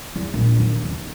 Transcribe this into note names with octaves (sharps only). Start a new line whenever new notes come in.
E2
A#1
D#2
C#3